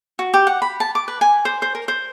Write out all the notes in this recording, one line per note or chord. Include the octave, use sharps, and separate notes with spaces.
F#4
G4
F#5
B5
A5
D6
B4
G#5
C5
C5
A#4
C5